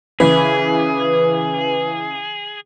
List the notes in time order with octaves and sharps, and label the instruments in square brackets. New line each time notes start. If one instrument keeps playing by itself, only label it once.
[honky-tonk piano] C#3 E3 [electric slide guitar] G#4 [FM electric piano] B4